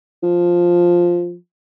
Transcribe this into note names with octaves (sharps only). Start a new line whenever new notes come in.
F3